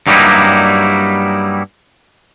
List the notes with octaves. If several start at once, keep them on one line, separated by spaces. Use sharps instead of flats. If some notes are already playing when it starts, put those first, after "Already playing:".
G2 F#3 G3 A#3 D#4 E4